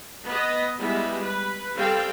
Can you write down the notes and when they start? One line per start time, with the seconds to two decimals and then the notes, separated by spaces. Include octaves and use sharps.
0.23 B3 B4 D#5
0.78 G3 G#3 B3 E4
1.20 B4
1.75 G3 C4 A4 F5 G5